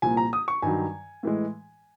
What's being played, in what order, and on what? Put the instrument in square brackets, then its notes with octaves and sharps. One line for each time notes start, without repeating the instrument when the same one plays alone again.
[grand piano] C2 A#2 F3 G#5
A#5
D#6
C#6
G2 D#3 F#3 G#5
A2 E3 G#3